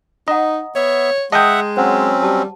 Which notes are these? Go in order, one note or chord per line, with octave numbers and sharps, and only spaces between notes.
D#4 D#5 F#5 A#5
B3 C#5 E5
G#3 D#5 E5 F#5 G5 A5 D#6
F#3 C4 C#4 C5 C#5 F#5
G3 G4 A5